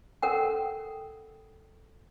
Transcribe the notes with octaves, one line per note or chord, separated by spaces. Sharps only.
A4 A#4 F#5 G5